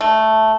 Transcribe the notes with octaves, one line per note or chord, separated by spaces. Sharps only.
A3